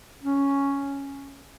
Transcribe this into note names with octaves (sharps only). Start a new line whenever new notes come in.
C#4